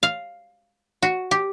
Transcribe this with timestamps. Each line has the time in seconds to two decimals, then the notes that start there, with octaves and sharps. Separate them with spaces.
0.03 F5
1.03 F#4
1.31 G4